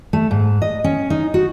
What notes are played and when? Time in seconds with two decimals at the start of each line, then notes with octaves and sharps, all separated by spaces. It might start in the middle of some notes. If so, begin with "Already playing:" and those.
0.13 A3
0.31 G#2
0.62 D#5
0.84 C#4
1.10 D#4
1.34 F#4